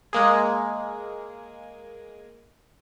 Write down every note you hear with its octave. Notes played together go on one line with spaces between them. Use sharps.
G#3 A#3 G#4